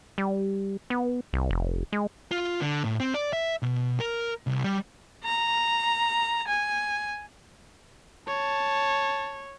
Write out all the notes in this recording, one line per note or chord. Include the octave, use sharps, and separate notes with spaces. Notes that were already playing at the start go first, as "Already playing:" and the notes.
G3
B3
C2
F1
G#3
F4
D3
A2
C4
D5
E5
B2
A#4
C2
G3
A#5
G#5
C#5 A5